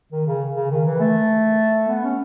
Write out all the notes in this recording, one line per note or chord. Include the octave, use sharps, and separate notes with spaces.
D#3
C#3
C#3
D#3
E3
A3
B3
C#4